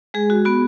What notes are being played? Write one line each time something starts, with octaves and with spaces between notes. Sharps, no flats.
G#3 G#4
F#4
B3 F#4